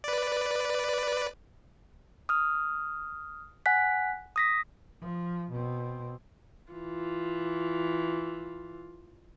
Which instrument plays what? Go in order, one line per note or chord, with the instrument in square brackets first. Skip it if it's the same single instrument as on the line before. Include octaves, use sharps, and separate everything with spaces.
[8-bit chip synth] B4 D5
[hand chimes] D#6 F6
F#5 G#5 F#6 B6
D#6 A#6 B6
[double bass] F3
B2 C4
[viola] E3 F4